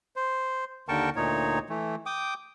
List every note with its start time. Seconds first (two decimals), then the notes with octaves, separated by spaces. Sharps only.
0.16 C5
0.89 D#2 D3 A#4 G5 A5 C#6
1.16 D2 A#2 D#4 C#5
1.69 E3 A3
2.06 G5 D6 D#6